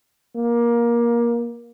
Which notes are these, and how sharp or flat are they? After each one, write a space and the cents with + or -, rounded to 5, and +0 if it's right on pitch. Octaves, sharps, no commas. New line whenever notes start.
A#3 +20